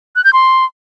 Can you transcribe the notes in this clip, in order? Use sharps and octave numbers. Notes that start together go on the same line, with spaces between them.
F#6
G6
C6